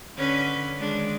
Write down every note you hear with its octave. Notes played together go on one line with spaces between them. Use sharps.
D3 C#4 B4
D#3 G#3 D4